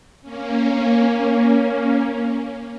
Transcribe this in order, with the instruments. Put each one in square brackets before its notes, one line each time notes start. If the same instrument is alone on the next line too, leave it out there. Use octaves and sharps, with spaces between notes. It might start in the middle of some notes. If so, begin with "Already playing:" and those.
[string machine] A#3 C#4